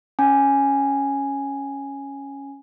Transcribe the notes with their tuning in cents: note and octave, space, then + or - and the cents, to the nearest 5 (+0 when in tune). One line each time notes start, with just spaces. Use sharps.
C#4 -5 G#5 +0